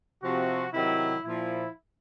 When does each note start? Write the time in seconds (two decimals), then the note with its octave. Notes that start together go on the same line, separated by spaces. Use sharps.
0.23 C3 F3 F#4
0.73 C3 D#3 F#3 E4
1.24 A#2 F3 E4